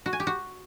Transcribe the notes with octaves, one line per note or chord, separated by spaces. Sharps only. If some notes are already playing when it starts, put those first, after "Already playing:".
F#4
G#5
G4
F#4